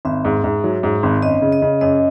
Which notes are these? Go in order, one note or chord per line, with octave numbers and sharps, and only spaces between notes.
G#1 E5
G#2
G#2
F#3
G#2
G#1
F#2 D#5
C#3
D#5
C#3
F#2 D#5